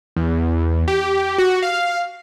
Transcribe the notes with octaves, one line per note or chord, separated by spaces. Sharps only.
E2
G4
F#4
F5